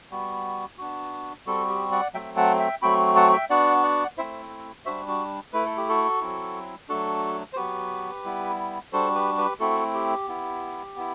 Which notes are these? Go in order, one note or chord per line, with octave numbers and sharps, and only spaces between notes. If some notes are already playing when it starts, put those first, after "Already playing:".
G3 B3 F#4
B3 D4 F#4
G3 C4 F#4 A4
G4
D5 F#5
F#3 A3 C4 E5 G5
F#5 A5
E5 G5
F#3 A3 C4 F#4 G5 B5
F#5 A5
E5 G5
B3 D4 F#4 D5 F#5
D5 F#5
A3 C4 E4 C5 E5
G3 D4 F#4 C5 E5
F#4
A3 E4 B4
A4
G4
F#4 A4
F#3 C4 E4
F#3 A3 D4 F#4 A4
C5
F#3 B3 F#4 G4 B4
G3 B3 E4
G3 D4 F#4 A4 C5
G4 B4
G4 B4
A3 C4 E4 F#4 A4
G4
B3 E4
B3 E4